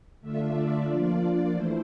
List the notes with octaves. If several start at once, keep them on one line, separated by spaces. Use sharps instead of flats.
D3 A3 D4 F4 E5
D5
F3 A#3 D4 F4
E3 A3 E4 C5